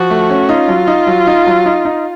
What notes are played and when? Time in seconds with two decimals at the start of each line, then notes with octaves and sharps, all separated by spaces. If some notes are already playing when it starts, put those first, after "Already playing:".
Already playing: F3 F#4
0.10 A3
0.30 C#4
0.49 D#4 F4
0.68 F#3
0.87 D#4
1.07 F#3
1.27 D#4
1.47 F#3
1.66 D#4
1.85 D#4